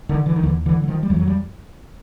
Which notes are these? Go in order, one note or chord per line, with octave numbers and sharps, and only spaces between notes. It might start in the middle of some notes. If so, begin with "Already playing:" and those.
D3 D#3
D3 E3
D#3
D#2 D3 E3
D3 E3
D3
F#3
D#3 F3
G3
F2 E3 F#3
F#3
F3 G3